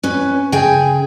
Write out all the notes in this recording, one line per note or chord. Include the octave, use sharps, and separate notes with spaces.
C#4 B4
C#3 G#4 G5 G#5